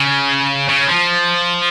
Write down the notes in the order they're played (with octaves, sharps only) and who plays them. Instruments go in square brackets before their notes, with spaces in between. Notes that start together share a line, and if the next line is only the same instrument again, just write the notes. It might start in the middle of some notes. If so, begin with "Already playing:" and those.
Already playing: [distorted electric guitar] C#3
C#3
F3